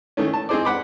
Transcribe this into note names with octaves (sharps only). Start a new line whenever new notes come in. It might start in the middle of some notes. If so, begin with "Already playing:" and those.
D#3 A3 C#4
A5
C4 D#4 G#4 C5 D5
F#5 B5 D6